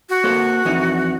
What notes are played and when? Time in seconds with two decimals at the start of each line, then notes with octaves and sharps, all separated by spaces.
0.09 F#4
0.24 A#3 A4 C5
0.65 F2 E3 D#4